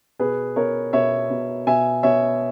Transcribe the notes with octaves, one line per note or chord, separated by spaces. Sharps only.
B2 G#4 B4
B2 A#4 C#5
B2 C#5 E5
B2
B2 E5 G#5
B2 C#5 E5